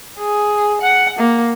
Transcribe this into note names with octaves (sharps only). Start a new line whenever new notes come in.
G#4
F#5
A#3